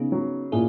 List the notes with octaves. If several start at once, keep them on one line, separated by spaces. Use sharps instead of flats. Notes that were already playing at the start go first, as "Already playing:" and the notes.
Already playing: C#3 B3 D#4
F#3
A#2 E4 G#4